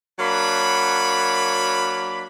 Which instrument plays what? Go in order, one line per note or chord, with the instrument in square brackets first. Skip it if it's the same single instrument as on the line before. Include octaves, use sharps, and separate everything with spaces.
[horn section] F#3 A#3 D4 B5